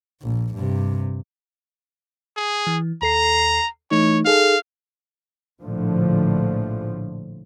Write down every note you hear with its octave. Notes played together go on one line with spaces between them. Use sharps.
A#1
G2 C3
G#4
E3
D#2 A4 A#5 C7
E3 A3 D#4 C#5
D#4 G#4 A4 F5
A#1 A2 D3 F3